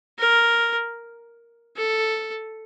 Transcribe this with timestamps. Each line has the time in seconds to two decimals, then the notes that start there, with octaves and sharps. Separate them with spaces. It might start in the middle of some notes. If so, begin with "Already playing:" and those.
0.19 A#4
1.76 A4